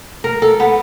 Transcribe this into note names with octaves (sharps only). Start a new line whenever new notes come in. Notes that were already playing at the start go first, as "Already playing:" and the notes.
A#4
A4
B3